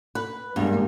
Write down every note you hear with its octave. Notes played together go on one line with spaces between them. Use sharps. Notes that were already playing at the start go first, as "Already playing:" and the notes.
B4
E2 G2 G3 G#3 A#3